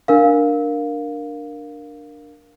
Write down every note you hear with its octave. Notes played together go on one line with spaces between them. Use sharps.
D4 A#4 F5